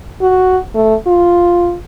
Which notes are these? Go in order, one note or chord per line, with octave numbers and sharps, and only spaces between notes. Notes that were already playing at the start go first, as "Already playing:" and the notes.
F#4
A3
F4